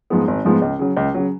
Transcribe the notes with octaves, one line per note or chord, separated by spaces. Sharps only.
G#2 F3 G#3 B3
G#1
G#2 F3 G#3 B3
C#2
C#3 F#3
C#2
C#3 F#3